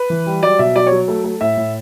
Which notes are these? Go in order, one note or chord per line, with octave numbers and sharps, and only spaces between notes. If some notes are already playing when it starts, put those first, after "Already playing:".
Already playing: B4
E3
G3
F#3 D5
B2 E5
F#3 D5
C#5
F#3
A3
A3
A2 E5
A2